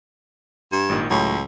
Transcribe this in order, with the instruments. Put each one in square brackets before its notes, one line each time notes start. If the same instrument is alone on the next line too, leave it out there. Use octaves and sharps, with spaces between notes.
[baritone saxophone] G2
[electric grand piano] G#1 A#2 D#3
[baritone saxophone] C#2 [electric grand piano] A2 F#3